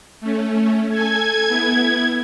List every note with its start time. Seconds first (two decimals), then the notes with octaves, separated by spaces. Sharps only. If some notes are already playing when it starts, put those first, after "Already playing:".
0.20 A3 C#4
0.90 A4 G#5 G#6
1.48 B3 E4